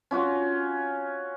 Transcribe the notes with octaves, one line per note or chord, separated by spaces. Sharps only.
C#4 F4 F#4